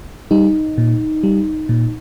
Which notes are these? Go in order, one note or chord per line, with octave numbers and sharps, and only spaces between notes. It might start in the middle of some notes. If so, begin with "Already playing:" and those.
G3 D#4
A#2
G3
A#2